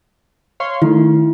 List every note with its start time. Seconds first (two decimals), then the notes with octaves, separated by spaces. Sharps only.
0.60 C#5 F5 C6
0.82 D#3 A3 E4